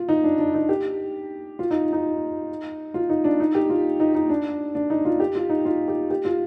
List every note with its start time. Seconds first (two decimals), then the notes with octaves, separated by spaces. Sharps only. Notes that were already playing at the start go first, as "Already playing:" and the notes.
Already playing: F4
0.09 D#4
0.24 D4
0.39 D4
0.54 D#4
0.69 G4
1.59 F4
1.71 D#4
1.93 D#4
2.94 F4
3.09 D#4
3.24 D4
3.40 D#4
3.55 G4
3.70 F4
4.00 D#4
4.15 D#4
4.29 D4
4.75 D4
4.90 D#4
5.05 F4
5.20 G4
5.35 F4
5.50 D#4
5.65 F4
5.88 G4
6.10 G4
6.25 F4